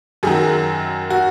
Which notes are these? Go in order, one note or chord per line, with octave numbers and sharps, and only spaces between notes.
F#2 D#3 F#3 G#4
F#4